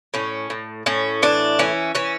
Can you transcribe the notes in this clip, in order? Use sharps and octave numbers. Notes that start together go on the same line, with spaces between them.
A2 C#4
A2
A2 C#4
E3 D4
E3 C#4
E3 C#4